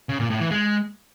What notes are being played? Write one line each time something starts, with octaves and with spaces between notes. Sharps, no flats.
C#3
A#2
A2
E3
G#3